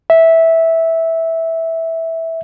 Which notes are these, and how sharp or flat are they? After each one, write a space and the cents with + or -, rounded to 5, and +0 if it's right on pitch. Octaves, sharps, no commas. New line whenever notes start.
E5 -10